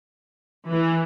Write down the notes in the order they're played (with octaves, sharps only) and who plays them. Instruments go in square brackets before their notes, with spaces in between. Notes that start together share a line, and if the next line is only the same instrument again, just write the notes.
[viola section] E3